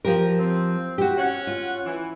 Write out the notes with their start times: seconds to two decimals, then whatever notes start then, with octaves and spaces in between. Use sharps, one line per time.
0.05 F3 G4 A#4
0.39 C4
0.98 F#4 G4
1.17 C#4 F#5
1.47 F4
1.85 E3